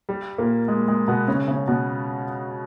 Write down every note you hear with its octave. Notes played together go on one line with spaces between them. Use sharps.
G3
A#2 A#3
G#3
G#3
B2 B3
C#3 C#4
C#3 C#4
B2 B3